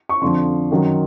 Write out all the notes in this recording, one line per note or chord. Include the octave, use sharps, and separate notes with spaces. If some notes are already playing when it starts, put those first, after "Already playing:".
C#6
F2 D3 F3 C6
F#2 D#3 F#3